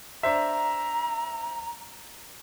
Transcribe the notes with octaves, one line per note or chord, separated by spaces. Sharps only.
D4 C5 E5 A#5